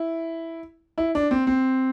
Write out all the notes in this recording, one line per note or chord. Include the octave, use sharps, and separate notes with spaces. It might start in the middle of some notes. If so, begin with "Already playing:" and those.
Already playing: E4
E4
D4
C4
C4